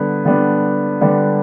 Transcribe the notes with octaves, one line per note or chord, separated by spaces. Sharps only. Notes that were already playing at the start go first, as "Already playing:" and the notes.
Already playing: D3 G3 B3 D4
D3 G3 B3 D4
D3 G3 B3 D4